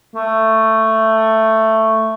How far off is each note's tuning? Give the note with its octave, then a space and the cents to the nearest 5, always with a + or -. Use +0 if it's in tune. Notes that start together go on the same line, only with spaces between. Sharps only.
A3 +10